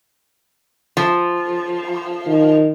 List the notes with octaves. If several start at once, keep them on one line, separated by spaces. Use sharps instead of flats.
F3
D#3